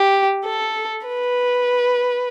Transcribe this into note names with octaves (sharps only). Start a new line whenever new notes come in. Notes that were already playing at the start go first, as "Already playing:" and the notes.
Already playing: G4
A4
B4